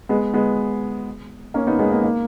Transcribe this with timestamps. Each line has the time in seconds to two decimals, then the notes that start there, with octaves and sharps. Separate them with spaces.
0.09 G#3 B3
0.34 G#3 B3
1.54 A#3 C#4
1.67 B3 D#4
1.79 G#3 B3
1.92 A#3
2.04 A#3